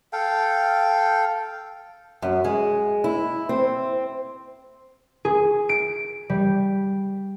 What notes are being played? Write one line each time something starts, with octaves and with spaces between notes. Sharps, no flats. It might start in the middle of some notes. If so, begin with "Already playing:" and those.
A4 F5 G5
F#2
G#3
E4
C4
G#4
D7
G3